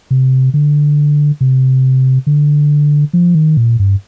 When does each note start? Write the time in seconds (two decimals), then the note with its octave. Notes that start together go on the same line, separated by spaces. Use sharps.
0.11 C3
0.54 D3
1.41 C3
2.27 D3
3.13 F3
3.35 D#3
3.57 A#2
3.79 G2